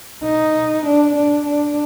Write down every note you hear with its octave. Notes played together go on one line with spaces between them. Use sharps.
D#4
D4
D4
D4